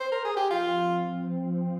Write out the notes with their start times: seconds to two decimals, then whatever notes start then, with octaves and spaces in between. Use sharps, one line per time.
0.00 C5
0.12 A#4
0.25 G#4
0.37 G4
0.50 F3 C4 F4